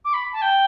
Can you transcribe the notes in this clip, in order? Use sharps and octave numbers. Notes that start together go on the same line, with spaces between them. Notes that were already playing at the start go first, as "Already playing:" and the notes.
D6
B5
A5
G5